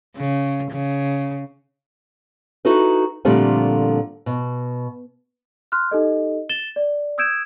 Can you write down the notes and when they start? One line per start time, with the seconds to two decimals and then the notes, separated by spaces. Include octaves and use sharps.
0.16 C#3
0.71 C#3
2.65 D#4 E4 F#4 A4 B4
3.25 A#2 D3 F3 G3 A3 C4
4.26 B2
5.72 C6 F6 F#6
5.91 D#4 G4 A4 D#5
6.49 A6 E7 G7
6.76 D5
7.18 D#6 E6 G6 G#6 D7 E7